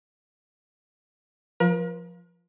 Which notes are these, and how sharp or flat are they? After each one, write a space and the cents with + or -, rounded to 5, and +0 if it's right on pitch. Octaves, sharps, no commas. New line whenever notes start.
F3 +5 A#4 +45